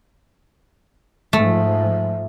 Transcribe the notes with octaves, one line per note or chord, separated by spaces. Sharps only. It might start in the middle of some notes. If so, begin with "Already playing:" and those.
G#2 F3 A3